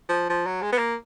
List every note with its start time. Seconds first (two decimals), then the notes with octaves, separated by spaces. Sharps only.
0.09 F3
0.29 F3
0.46 F#3
0.62 G#3
0.72 B3
0.78 A#3